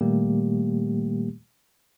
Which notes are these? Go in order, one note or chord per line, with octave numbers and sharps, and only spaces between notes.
A#2 D#3 G3 A3 A#3 G4